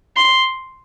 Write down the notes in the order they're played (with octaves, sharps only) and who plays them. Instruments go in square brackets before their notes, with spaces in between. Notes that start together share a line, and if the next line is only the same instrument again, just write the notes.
[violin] C6